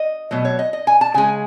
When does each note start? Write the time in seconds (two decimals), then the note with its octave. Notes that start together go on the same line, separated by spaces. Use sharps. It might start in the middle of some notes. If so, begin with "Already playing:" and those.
Already playing: D#5
0.31 B2 F#3 A3 D#5
0.45 C#5
0.59 D#5
0.73 D#5
0.87 G#5
1.01 A5
1.14 C#3 G#3 G#5